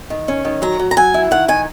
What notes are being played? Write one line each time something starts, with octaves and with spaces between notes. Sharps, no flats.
D#3
C#4
D#3
F#3 A#5
F#3
A#5
F#3 G#5
E4
D#3 F#5
D#3 G#5